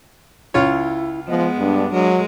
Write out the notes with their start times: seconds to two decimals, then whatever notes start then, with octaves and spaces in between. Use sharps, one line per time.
0.54 C#2 E4 F4 C#5
1.28 F3 G#3 B3 D#5
1.58 G2 D4
1.92 F#3 G#3 A#4